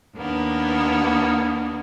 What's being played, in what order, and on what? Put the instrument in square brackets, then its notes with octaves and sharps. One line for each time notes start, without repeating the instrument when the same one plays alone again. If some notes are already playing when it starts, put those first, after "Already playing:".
[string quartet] D#2 A#3 B3 D4